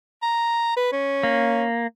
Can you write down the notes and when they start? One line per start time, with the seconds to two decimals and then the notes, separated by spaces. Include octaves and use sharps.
0.22 A#5
0.77 B4
0.92 C#4
1.23 A#3